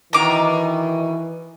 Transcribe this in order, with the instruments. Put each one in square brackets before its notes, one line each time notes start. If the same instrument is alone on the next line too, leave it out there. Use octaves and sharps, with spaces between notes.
[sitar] B2 D#3 [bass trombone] E3 [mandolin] A#5 D6